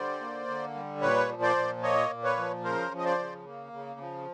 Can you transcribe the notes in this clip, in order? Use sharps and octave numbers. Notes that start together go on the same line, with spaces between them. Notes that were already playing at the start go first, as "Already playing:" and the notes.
Already playing: D3 G3 C5 D5
A#3
D3
G3
A#2 B4 C#5
F3
C5 D5
A#2
A#3 C#5 D#5
A#2
B4 C#5
F3
C#3 A#4 C5
F3
D#5
C5 D5
C#3
A#3
C#3
F3